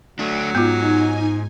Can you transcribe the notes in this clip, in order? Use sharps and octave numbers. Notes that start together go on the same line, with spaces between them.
F#3 A3 D4
G#2 B3 D#4 F4 G#5